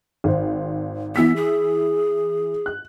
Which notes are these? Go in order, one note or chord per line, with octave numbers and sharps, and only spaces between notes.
G#1 C5
E3 B3 E6 B6
G#4
F#6